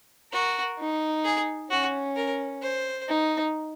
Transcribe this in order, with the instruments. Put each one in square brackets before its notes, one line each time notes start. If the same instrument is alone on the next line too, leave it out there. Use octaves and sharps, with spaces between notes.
[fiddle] F#4 [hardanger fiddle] A#4
[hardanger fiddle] D#4
[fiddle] G#4
[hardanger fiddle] C#4 [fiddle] F#4
[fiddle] A#4
C5
[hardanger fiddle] D#4